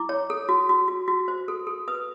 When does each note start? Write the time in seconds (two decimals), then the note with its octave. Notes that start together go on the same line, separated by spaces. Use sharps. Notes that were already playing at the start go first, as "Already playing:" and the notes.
Already playing: E4 D6
0.09 C#5
0.30 A4
0.49 F#4
0.69 F#4
0.88 F#4
1.08 F#4
1.28 C5
1.48 A4
1.67 A4
1.88 B4 D#6